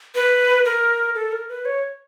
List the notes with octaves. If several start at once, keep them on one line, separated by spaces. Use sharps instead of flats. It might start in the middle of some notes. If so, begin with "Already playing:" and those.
B4
A#4
A4
A#4
B4
C#5